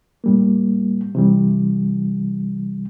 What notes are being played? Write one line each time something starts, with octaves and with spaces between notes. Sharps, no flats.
A2 G3 A#3
C3 E3 G3